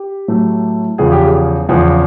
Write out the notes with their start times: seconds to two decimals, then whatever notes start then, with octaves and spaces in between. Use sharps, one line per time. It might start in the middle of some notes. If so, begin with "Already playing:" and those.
Already playing: G4
0.28 A2 F#3 A3
0.98 E2 C#3 F3 G#4
1.12 G4
1.25 G#4
1.69 E2 C#3 F3